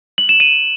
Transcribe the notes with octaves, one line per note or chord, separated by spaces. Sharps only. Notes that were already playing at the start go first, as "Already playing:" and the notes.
F#7
E7
D#7